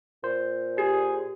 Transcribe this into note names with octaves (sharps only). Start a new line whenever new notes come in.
A#2 C5
G4 G#4